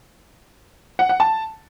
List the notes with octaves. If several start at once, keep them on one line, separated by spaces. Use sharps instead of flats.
F#5
F#5
A5